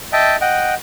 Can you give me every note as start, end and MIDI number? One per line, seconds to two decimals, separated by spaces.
0.13 0.36 75
0.13 0.36 76
0.13 0.36 79
0.13 0.36 81
0.41 0.74 75
0.41 0.74 78
0.41 0.74 79